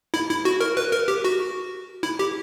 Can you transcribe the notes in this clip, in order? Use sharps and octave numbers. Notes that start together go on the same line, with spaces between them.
E4
E4
F#4
A#4
B4
A#4
G4
F#4
E4
G4